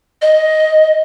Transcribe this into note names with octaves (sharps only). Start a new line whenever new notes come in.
D#5